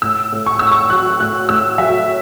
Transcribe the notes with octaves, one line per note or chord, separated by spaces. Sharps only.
A2 E6
A2
C#6
A2 E6
C#6
F#3 F#6
A2 F#6
A2 E6
F#3 E5